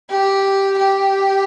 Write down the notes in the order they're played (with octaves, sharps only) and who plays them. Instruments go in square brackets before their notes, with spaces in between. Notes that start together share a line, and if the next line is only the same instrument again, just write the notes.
[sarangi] G4
G4